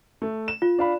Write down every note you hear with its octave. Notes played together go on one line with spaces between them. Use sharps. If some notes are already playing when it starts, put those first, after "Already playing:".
A3
E7
F4
D4 F5 B5